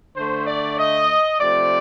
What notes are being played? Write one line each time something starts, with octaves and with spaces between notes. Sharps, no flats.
D3 A3 C5
D5
D#5
C3 F3 A3 D5